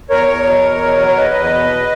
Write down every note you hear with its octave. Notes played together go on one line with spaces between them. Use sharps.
E2 A#4 C#5
E2
B2
E2
B2
F#3
C#5
E2 B4 D#5
E2
B2